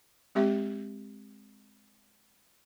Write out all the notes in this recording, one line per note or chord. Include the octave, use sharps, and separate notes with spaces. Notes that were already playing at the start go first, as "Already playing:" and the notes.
G#3 C4 G4 E5